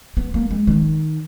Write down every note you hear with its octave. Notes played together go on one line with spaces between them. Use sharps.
B3
A#3
G#3
D#3